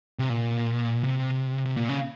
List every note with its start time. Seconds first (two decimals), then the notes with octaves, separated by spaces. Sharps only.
0.19 C3
0.29 A#2
1.04 C3
1.66 C3
1.77 A#2
1.89 C#3